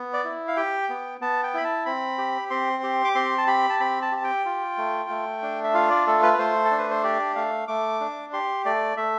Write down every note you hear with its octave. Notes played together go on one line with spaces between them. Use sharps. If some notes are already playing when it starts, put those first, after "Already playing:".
Already playing: B3
D5
E4
F5
G4 G5
B3
B3 A5
G5
E4 B5
A5
C4 B5
G4
C4 C6
G4
D6
C4 C6
A5
G4 B5
A5
C4 B5
A5
G4 A5
G5
F4
A3
A3
D4
E5
F4 F5
D5
A3 A4
B4
B4
A3 C5
A4
D4
B4
C5
G4 D5
A3 F5
A3 D6
D4
G4 C6
A3 D5
A3 E5